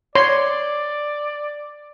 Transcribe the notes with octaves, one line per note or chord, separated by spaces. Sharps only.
C#5 D5 C6